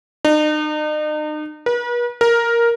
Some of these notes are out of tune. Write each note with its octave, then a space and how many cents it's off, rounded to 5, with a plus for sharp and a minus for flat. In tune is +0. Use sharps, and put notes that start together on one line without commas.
D#4 -40
B4 -45
A#4 +5